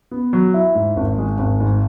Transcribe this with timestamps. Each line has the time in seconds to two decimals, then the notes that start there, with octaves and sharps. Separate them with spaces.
0.11 B3
0.33 F#3
0.54 E4
0.75 G#2
0.96 G#1
1.18 G#3
1.39 G#1
1.60 G#2